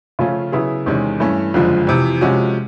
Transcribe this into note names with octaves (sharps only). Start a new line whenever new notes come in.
C#3 F3 A3 C#4 F4
C#3 F#3 B3 E4 G#4
E2 C3 D#3 G#3 C#4
G2 E3 A3 C#4
F#1 F2 D3 F3 G#3
F2 C3 E3
C3 F3 G#3 C#4 F#4